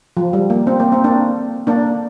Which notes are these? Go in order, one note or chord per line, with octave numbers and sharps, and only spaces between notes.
F3
G3
A#3
C4
A#3
C4
A#3 D4
A#3 D4